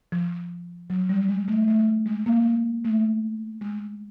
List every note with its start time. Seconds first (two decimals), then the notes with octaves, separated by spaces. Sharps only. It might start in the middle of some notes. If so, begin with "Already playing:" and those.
0.12 F3
0.90 F#3
1.09 G3
1.28 G#3
1.48 A3
1.68 A3
2.06 G#3
2.26 A#3
2.85 A3
3.61 G#3